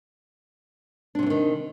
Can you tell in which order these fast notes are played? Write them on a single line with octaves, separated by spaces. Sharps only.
D4 C3 F#3 E3 D#3